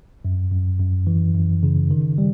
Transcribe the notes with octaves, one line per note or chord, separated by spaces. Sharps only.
F#2
F#2
F#2
E3
F#2
C#3
D#3
G3